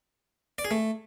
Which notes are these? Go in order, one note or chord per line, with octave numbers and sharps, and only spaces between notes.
D5
G#4
A3